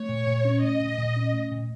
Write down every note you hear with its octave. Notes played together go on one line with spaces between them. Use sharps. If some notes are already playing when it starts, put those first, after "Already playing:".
Already playing: A3 C#5
A#2
A#2
C#4
A3 D#5
A#2
A#2
C#4
A3
A#2